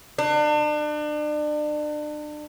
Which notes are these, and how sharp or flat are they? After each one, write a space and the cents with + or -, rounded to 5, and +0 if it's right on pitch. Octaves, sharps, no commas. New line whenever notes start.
D4 +35